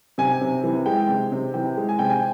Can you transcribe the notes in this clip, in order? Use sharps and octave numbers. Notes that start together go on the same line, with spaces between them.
C3 G#5
C3
E3
G#3 G5
C3
C3
E3 G5
G#3
G#5
C3 G5
G#5